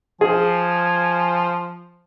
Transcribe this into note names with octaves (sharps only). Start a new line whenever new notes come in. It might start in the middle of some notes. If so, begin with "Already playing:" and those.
F3 G#4 G#5